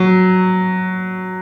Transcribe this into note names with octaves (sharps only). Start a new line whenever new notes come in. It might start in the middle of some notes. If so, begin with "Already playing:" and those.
Already playing: F#3